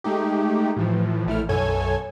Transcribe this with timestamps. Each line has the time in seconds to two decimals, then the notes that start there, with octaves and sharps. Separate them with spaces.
0.04 G#3 A3 D#4 G4
0.77 A2 E3 F3
1.26 A#1 A3 E4 F6
1.49 B1 F#2 A4 C#5 G#5 G#6